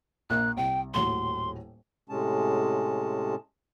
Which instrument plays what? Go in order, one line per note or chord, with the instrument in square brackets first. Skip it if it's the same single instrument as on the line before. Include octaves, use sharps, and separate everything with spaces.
[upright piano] A#1 A#3 [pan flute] F#6
[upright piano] C2 [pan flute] G5
[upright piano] D#1 A2 F#3 [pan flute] C6
[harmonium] A2 C3 G#3 C#4 A5